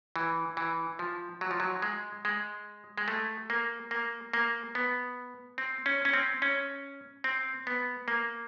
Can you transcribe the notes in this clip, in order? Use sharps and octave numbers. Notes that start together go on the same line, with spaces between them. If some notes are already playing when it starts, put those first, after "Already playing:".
E3
E3
F3
F#3
F3
F#3
G#3
G#3
G#3
A3
A#3
A#3
A#3
B3
C4
C#4
C#4
C4
C#4
C4
B3
A#3